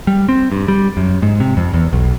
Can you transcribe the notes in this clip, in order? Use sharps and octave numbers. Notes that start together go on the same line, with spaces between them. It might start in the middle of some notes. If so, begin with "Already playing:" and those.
G3
C4
G2
G3
F#2
G#2
C3
F2
E2
B1